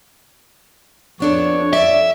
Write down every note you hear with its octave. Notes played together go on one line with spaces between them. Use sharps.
F2 B3 D4 A4 C#5
A4 D5 E5